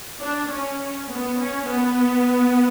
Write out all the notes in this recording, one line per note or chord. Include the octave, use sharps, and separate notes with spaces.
D4
C#4
B3
C#4
B3